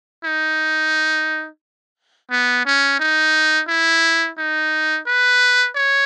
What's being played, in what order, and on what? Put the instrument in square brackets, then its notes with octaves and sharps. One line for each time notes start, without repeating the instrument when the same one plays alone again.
[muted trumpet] D#4
B3
C#4
D#4
E4
D#4
B4
C#5